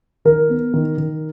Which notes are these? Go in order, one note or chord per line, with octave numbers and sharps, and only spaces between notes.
D#3 A#4
B3
D#3
D#3